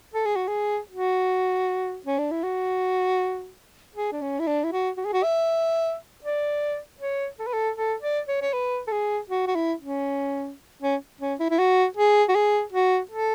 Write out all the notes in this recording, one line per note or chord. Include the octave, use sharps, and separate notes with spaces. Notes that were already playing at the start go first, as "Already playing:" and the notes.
A4
G#4
F#4
G#4
F#4
C#4
D4
E4
F#4
G#4
D4
C#4
E4
D4
E4
F#4
F#4
G#4
F#4
E5
D5
C#5
A4
B4
A4
A4
D5
C#5
C#5
B4
A4
G#4
F#4
F#4
E4
C#4
C#4
C#4
E4
E4
F#4
G#4
F#4
G#4
F#4
A4